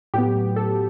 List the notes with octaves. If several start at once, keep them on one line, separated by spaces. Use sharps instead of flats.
A2 F#3 B3 G4
A4